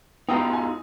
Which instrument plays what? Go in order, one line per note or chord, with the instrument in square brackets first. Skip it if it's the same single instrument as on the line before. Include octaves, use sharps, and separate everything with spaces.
[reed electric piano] B3 A#5 [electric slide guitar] D#4 F4 F#4 [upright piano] G5 D#6
[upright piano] G#5